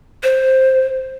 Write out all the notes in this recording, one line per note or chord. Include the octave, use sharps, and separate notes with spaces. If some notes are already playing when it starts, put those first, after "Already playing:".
C5